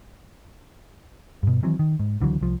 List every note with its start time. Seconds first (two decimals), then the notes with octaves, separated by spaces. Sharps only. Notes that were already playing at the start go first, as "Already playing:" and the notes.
1.43 G2 B2
1.63 D#3 E3 F#3 C4
1.79 D#3
1.99 G#2
2.21 C#2 D3 E3 F#3
2.41 C2 F3